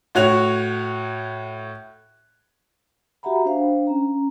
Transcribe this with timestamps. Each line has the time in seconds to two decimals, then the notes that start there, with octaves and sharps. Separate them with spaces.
0.15 A2 F#4 C#5 F7
3.23 F#4 G4 E5 F#5 A#5 B5
3.45 D4 C5 F5 G5
3.87 C#4 A#5